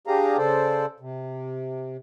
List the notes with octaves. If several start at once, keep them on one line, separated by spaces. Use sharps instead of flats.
D4 G4 G#4 F5 A#5
C#3 A4 C5 D5
C3